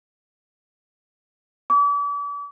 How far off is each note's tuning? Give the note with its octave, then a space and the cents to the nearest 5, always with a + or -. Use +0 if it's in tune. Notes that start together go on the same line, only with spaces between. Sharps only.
D6 -40